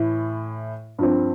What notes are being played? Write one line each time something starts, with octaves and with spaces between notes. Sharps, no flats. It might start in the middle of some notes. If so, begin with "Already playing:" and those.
Already playing: A2 E3 E4
G2 F3 C4